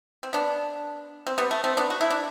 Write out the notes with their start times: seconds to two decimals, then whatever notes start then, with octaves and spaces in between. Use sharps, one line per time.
0.23 C4
0.33 B3 D4
1.27 C4
1.38 G3 B3
1.51 A3
1.64 A3 C4
1.77 B3 D4
1.90 F#4
2.01 E4
2.10 D4